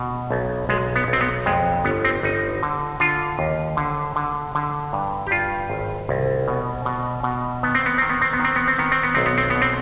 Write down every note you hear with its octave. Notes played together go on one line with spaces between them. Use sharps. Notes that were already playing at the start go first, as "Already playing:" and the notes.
Already playing: B2
B1
B1 G#3
B3
B1 C4
B3
F2 G#3
G1 B3
C4
G1 D#4
D3
D3 F4
D#2
D3
D3
D3
G2
G4
G2 F4
G#1
C2
B2
B2
B2
D#3 B3
C4
B3
D#3 C4
B3
C4
B3
D#3 C4
B3
C4
D#3 B3
C4
B3
B1 C4
B3
C4
B2 B3
C4